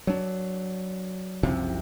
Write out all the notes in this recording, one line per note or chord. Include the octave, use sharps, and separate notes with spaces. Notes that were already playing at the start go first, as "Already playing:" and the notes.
F#3 D4
F#1 C2 C3 F3